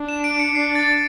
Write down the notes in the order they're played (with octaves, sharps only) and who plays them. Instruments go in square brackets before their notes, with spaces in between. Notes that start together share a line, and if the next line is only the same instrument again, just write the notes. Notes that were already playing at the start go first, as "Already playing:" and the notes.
Already playing: [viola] D4
[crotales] E7
D7
C#7
[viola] D4 [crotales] C7
[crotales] A6